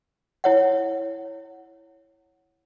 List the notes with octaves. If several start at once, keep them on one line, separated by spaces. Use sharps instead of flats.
E4 C#5 F#5